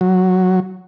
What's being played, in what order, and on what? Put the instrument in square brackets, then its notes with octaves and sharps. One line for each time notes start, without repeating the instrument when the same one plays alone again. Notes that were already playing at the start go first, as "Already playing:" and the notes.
[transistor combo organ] F#3